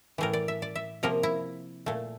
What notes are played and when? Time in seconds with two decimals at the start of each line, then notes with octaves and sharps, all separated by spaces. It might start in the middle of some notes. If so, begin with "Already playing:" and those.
0.18 A2 E3 A3 A#4
0.33 D5
0.48 E5
0.62 D5
0.75 E5
1.03 C3 F3 A#3 A#4
1.23 E4
1.86 A#2 A3